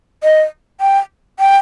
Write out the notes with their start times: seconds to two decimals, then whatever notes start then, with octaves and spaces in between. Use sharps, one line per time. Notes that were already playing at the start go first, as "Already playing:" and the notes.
0.24 D#5
0.81 G5
1.40 G5